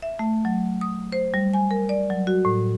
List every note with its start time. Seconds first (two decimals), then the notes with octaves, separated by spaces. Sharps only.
0.02 E5
0.19 A3
0.45 F#3
0.81 D#6
1.12 C5
1.34 G3
1.54 G#5
1.71 A#4
1.89 D5
2.10 F#3
2.27 F#4
2.45 A2